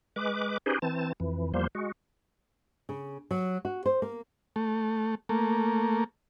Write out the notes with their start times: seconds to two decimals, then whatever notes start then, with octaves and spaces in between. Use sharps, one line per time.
0.16 G#3 B4 D6
0.66 C#4 D#4 G4 G#4 B4 C5
0.82 E3 C4 A5
1.20 F2 E3
1.54 E2 F3 G3 A#3 C5
1.75 G#3 F#4
2.89 C#3
3.31 F#3
3.65 F#4
3.86 C5
4.02 A#3
4.56 A3
5.29 A3 A#3